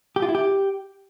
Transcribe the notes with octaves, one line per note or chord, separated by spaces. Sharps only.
G4
F4
E4
G4